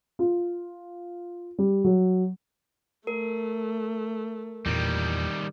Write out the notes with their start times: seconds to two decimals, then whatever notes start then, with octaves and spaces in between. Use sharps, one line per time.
0.19 F4
1.58 G3
1.84 F#3
3.07 A3 A#4
4.66 E2 A#2 D#3 G3